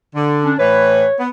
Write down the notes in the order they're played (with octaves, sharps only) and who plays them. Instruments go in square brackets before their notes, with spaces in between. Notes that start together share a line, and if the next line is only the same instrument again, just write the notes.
[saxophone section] D3
[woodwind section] C#4 D4
[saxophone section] A2 E3 B4 [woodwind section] C#5
[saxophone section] B3